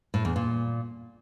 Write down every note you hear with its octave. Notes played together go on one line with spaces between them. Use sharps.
A2
E2
A#2